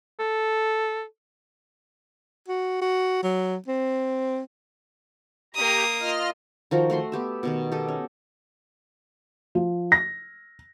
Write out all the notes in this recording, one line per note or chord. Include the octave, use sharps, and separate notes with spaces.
A4
F#4
F#4
F#3
C4
A#3 G4 A#5 D#6
F4 D#5 F6
D#3 F3 F#4 A#4
A3 F#4 C6
B3 G4 E5
B2 D#3 B3
G4 A4 D#5
C#4
F3
A#6